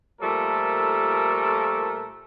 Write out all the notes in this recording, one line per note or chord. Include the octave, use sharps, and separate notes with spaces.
A#2 F3 G3 A3 A4 A#4